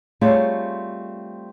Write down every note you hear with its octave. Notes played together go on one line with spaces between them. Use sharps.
G3 A3 C4 F4 G#4 C#5